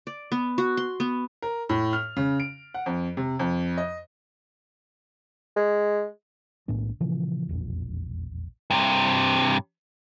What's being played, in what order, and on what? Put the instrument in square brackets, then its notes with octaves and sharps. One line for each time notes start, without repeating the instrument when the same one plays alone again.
[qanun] D5
B3
F#4
C6
B3
[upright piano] A#4
A2
F6
C#3
D7
F#5
F2
C3
F2
D#5
[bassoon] G#3
[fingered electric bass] B1 A2 B3 D4
A#2 C#3 E3 F3
E1 A#1 F2
[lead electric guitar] G2 C3